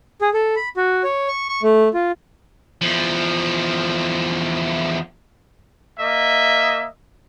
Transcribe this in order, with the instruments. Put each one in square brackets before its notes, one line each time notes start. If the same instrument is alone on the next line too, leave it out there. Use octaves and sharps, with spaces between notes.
[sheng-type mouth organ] G#4
A4
B5
F#4
C#5
C#6
C#6
A3
F4
[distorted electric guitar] E2 F3
[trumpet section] A#3 D#5 E5